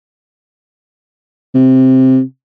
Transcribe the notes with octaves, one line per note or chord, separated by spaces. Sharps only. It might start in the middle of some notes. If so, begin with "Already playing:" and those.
C3